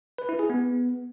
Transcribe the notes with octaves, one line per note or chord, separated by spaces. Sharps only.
B4
E4
G#4
B3